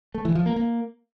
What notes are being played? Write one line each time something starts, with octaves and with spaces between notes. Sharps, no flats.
A3
E3
F3
A#3
A#3